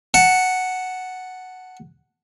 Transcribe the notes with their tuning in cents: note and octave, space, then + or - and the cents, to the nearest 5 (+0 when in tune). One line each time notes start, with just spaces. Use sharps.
F#5 +0 A5 +5